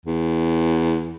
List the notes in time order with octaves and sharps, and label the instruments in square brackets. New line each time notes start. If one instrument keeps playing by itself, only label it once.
[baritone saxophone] E2